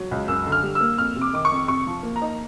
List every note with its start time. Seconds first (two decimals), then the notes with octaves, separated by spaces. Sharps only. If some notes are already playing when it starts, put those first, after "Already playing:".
Already playing: F#3
0.11 C#2
0.28 F#2 E6
0.46 D3
0.52 F6
0.63 G3
0.75 E6
0.81 A#3
0.98 F2 F6
1.16 C3
1.21 D6
1.33 D#3 D6
1.45 C#6
1.52 F2
1.68 C3 C#6
1.87 F3
2.03 A#3
2.16 A#5
2.22 D#4